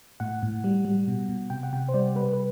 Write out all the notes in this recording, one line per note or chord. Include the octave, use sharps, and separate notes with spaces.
A2 F#5
A2
G3
G3
B2
B2
C3 G5
F#5
C3 G5
C5
G3 D5
G3 B4
B4